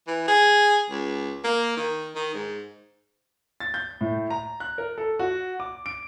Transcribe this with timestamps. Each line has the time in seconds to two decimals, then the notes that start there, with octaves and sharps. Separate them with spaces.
0.07 E3
0.28 G#4
0.90 C#2
1.44 A#3
1.77 D#3
2.15 D#3
2.34 G#2
3.60 A6
3.74 G6
4.01 A2
4.30 A#5
4.60 F#6
4.78 A#4
4.98 A4
5.19 F#4
5.60 D6
5.86 D7